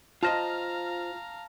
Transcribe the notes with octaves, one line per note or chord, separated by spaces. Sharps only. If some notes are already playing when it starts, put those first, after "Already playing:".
F4 C5 D#5 F5 A5 A#5 F6 A#6